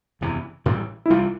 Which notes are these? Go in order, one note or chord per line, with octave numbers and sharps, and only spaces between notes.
F#1 E2 C3 E3
A1 A2 E3 G3
E4
C2 C3 E3 G3 F4